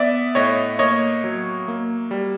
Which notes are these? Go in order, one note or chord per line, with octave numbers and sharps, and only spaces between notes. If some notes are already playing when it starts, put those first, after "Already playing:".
Already playing: B3 D5 E5
A2 C#5 D#5
A#3 C#5 D#5
F#3
A#3
G3